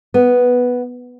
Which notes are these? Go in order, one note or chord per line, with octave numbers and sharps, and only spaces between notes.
B3